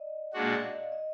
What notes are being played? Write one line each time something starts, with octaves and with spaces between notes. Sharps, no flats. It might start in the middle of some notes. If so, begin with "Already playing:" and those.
Already playing: D5 D#5
A#2 G#3 D4 F#4 D5
D5
D#5
F5
D#5
F5
D#5